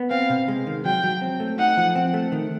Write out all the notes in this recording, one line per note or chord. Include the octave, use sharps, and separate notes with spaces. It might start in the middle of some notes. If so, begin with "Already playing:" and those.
Already playing: B3
C4 F5
C3
G#3
D#3
F#3 G5
F#3
C4
A3
D#4 F#5
F3
C4
A3
D#3